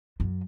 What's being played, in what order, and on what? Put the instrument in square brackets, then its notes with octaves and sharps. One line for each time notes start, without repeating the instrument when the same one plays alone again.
[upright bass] F#2